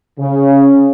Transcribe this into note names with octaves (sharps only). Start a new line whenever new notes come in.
C#3